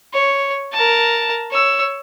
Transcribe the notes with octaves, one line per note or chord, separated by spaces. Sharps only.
C#5
A#4 A5
C#5 E6